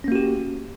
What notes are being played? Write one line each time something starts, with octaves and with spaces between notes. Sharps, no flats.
A#3 C#4 F#4 G4